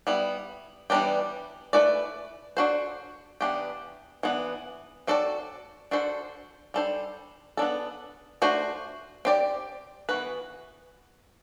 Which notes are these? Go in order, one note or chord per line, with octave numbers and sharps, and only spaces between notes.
G3 B3 E4
E3 G3 B3 D4 G4
A3 E4 B4 D5
D4 F#4 A4 C5
E3 B3 D4 G4
E3 B3 D4
C4 F#4 A4 D5
D4 F#4 A4 C5
G3 D4 A4 C5
B3 D4 A4
A3 D4 F#4 C5
C4 G4 D5
E3 B3 F#4 B4